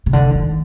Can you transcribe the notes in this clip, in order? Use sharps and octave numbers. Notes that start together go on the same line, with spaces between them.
C3
D3
D#3